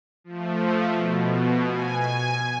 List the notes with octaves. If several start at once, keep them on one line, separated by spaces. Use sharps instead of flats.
F3 A3
B2
G#5